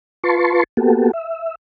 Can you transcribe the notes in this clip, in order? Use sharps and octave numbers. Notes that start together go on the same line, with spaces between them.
F4 B4 A5 C6 C#6
A#3 B3 F#4 G4 A4
E5